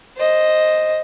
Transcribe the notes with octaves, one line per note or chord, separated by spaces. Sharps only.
C5 D#5